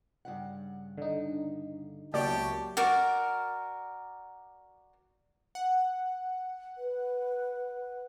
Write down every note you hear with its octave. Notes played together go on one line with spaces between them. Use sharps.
G2 C#3 F#5
D3 D#4
C#2 F#3 A#3 E4 G4 D5 A5 C#6
F#4 A#4 D5
F#5
B4